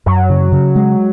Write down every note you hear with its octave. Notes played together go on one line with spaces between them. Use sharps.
F#2 F#3
C#3
C#3
G#3